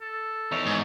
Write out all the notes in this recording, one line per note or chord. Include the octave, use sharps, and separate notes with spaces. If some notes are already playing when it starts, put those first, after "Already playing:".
A4
E2 D#4 C#5 E5
G#2